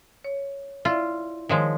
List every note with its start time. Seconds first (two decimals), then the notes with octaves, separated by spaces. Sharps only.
0.24 C#5
0.85 E4 F4 D5 E5
1.49 D#3 F3 G#3 C#5